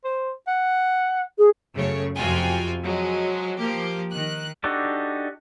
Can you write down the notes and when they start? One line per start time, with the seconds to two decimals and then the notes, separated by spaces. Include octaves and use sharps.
0.04 C5
0.47 F#5
1.38 G#4
1.73 F#2 C#3 A3 C#5
2.15 F2 C3 F4 F#4 G5 G#5
2.82 F3 F#3 G#3
3.58 F3 A#3 G4
4.12 D#3 F#6
4.64 D4 D#4 F#4 G4 A4